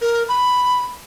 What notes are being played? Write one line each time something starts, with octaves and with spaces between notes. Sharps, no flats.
A#4
B5